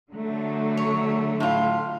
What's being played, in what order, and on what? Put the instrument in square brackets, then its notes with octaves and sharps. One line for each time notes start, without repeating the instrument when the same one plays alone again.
[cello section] D3 F#3 A3
[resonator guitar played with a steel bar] C#5
A2 F4